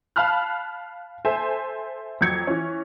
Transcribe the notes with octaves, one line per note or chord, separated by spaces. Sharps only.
F5 A5 B5 F6 F#6
A4 C5 E5 G#5
F2 F#3 G#6 C#7
E3 C#4